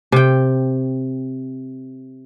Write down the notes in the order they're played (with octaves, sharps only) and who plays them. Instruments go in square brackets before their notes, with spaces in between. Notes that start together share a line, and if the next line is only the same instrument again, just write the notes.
[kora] C3 G5